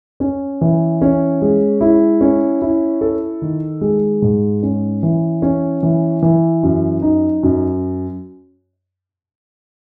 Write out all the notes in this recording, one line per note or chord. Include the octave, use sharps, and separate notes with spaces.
C#4
E3
C#4
G#3
E4
C#4
E4
A4
D#3
G#3
G#2
C#4
E3
C#4
E3
E3
F#2
D#4
F#2